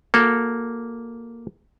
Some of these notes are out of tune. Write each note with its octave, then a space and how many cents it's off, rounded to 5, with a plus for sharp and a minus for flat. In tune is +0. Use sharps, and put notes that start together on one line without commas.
A#3 +0 F#4 -20 A4 +0